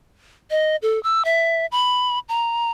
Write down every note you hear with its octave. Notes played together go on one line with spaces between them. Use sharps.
D#5
A4
E6
E5
B5
A#5